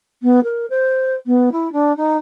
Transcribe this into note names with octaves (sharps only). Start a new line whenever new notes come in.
B3
A#4
C5
B3
E4
D4
D#4